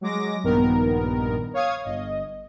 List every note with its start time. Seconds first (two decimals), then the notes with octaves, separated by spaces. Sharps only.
0.01 F#3 G#3 D6 A#6
0.43 A#1 G2 D#3 B3 A#4
1.54 C#5 F5 D#6 G#6
1.84 G1 D#5